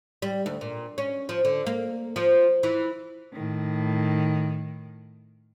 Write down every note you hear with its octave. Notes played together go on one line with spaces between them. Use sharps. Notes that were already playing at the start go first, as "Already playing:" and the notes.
G3
D2
A#2
C#4
F3
D3
A#3
F3
E3
A2 D#3